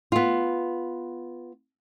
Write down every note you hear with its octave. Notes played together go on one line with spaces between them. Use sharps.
B3 F4